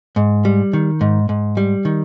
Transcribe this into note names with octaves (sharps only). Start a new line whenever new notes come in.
G#2
G3
D#3
G#2
G#2
G3
D#3